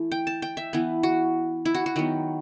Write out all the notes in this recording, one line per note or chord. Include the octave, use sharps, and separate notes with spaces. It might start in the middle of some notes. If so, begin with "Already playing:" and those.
Already playing: E3 A3
G5
A5
G5
E5
E3 B3
F#4
E4
F#4
F#4
D#3 F#3 B3